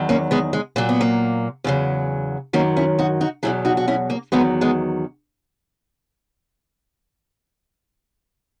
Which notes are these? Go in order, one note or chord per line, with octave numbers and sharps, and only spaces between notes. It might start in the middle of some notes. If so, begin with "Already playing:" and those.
Already playing: E2 D#3 F#3
A#3 C#4
G#3 B3
G#3
A#2 F#3 A#3
B3
A#3
E2 C#3 F#3
F#2 D#3 F#3 A#3 C#4
C#4 E4
D#4 F#4
D#4 F#4
E2 B2 F#3 E4 G#4
D#4 F#4
F#4
C#4 E4
A#3
E2 D#3 F#3 G#3 B3
G#3 B3